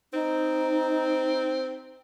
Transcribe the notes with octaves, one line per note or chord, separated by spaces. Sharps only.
C4 D#4